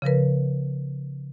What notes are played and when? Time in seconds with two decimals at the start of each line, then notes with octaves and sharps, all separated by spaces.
0.02 C#3 F3 A#4 B4